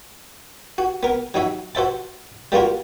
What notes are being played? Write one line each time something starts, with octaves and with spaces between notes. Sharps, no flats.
F#4
B3 A#4
F#3 D#4 F#4 E5
F#4 C5 E5 A5
G3 A#3 F4 F#4 A#4